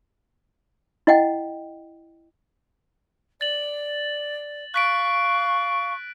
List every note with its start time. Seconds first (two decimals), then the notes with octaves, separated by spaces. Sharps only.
1.07 E4 D#5 F#5 G5
3.41 D5 A6 F#7
4.74 F5 C#6 F#6 B6 D7